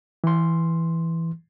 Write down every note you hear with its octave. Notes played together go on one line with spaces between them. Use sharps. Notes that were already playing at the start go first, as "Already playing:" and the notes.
E3 C6